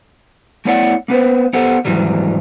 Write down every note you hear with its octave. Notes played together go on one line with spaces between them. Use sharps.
A3 B3 E4 C#5 D5 F#5
A#3 B3 B4 C5
B3 G4 A4 C5 F#5
D#2 G#2 E3 F#3 G3